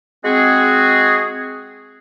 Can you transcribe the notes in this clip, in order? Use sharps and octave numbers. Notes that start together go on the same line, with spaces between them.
G#3 C4 F#4 G#4